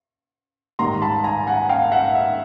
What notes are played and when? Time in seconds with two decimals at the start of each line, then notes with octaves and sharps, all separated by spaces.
0.79 G#2 D#3 G3 A#5 C6
1.02 A5 B5
1.24 G#5 A#5
1.47 F#5 G#5
1.69 F5 G5
1.92 E5 F#5
2.15 E5